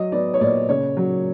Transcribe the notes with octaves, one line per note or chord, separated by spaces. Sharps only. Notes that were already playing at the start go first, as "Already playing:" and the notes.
Already playing: F#3 D#5
B3 D5
C#5
A#2 D5
C#3 C#5
F#3